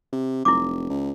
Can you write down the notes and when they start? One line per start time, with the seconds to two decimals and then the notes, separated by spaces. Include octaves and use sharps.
0.13 C3
0.45 F1 E4 D6
0.90 C#2